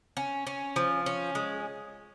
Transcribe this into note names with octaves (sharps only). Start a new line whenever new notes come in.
C#4
C#4
F3
C#4
G#3